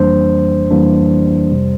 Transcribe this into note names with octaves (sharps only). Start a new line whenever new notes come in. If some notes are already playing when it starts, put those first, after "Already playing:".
Already playing: F2 E3 G3 A#3 D4 C5
F2 E3 G3 A#3 D4
F2 C3 G3